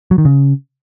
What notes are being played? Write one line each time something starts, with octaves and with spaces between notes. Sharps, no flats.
F#3
D#3
C#3